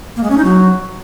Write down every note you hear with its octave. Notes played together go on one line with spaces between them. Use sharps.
A#3
G#3
C#4
D#4
F#3